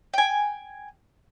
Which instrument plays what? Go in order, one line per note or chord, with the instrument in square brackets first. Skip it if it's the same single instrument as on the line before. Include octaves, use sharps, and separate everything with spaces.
[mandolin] G5 G#5